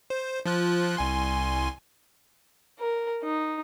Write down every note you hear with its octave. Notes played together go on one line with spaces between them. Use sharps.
C5
F3 F4 F#6
C2 G#5 C6
A#4
D#4